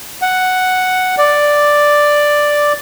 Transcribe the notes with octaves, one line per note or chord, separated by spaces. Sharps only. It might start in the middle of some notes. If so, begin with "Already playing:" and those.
F#5
D5